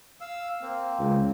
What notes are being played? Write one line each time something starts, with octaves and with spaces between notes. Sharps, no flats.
F5 E6
A#3 C4
C#2